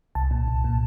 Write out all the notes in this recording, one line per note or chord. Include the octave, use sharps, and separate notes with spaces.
C2 A5
A#2
C2
A#2